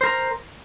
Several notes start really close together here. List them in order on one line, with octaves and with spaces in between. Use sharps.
C5 A#4 A#5